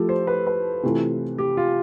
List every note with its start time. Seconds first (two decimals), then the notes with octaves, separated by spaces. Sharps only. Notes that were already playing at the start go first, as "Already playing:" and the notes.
Already playing: F3 A3 E4 G4 A4
0.09 C5
0.27 B4
0.47 B4
0.83 C3 E3 A3 C4 F4
1.38 G4
1.57 F4